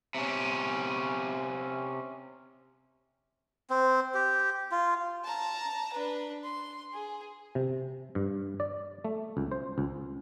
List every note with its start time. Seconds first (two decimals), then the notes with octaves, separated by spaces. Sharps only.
0.15 C3 C#4
3.70 C4
4.14 G4
4.72 F4
5.24 A5 A#5
5.93 D4 B4
6.44 C6
6.93 G#4
7.55 C3
8.15 G2
8.60 D5
9.04 A3
9.37 C#2
9.52 C5
9.78 C#2